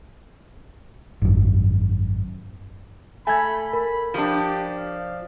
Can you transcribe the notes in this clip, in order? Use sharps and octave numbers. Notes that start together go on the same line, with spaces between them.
G#1 F#2
A3 G#5 B5 G#6
A#4 B5
F3 D4 G4
F5